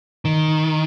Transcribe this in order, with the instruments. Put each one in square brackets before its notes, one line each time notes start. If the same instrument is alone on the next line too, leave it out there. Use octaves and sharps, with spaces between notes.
[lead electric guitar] D#3